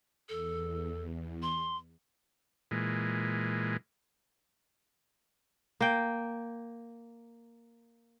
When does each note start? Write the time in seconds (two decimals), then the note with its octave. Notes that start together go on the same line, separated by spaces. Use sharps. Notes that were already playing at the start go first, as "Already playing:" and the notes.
0.29 E2 A4
1.42 C6
2.71 A#2 E3 G#3
5.81 A#3 G5